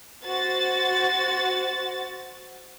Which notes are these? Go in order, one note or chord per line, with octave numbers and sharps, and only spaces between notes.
F#4 C5 A6